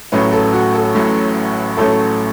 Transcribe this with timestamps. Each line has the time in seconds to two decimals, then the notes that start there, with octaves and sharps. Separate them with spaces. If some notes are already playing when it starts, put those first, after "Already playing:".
0.12 A1 A2 F#3 A3 C#4 B4
0.33 A4
0.53 F#4
0.74 A4
0.95 A1 A2 F#3 A3 C#4
1.77 A1 A2 F#3 A3 C#4 A4